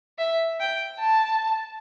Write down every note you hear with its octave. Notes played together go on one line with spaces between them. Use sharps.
E5
G5
A5